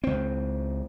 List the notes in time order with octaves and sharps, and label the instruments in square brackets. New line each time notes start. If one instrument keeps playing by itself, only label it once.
[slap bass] C#2 C4